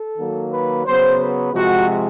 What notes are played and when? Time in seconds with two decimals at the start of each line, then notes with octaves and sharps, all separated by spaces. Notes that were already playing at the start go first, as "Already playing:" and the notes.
Already playing: A4
0.18 D#3 F#3 A#3
0.52 B4
0.86 C#3 F#3 B3 C5
1.20 B4
1.54 C3 F3 G#3 F#4